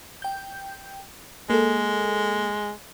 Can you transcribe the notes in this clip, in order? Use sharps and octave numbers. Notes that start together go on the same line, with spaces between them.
G5 G6
G#3 A#3 A4